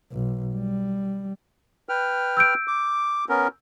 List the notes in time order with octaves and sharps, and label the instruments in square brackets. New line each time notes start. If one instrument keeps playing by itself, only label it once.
[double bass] B1
G3
[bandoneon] B4 G5 F6
[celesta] E6 G6 D7
[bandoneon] D6
B3 C#4 A#4